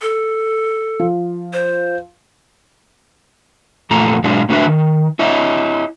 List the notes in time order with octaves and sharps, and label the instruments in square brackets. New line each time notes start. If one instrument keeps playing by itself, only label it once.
[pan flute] A4
[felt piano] F3
[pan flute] C5
[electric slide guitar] F2 A#2 E3 A3 A4 A#5
G#2 B2 F#3 G#3 D4 E4
A2 A3 D4 F#4 B4 E5
D#3
E4 C#5 D#5 E5